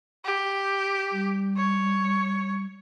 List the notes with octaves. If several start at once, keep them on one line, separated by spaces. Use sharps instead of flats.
G4
G3
C#5